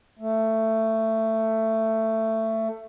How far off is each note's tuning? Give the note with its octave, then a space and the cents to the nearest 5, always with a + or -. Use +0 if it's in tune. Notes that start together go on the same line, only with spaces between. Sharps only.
A3 +15